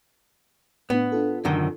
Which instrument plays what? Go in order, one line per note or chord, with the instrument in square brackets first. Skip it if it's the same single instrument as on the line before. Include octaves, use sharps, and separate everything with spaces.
[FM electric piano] A2 D4 [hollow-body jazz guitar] B3
[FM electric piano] D4 F4 A4
[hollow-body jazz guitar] F#2 D3 D#3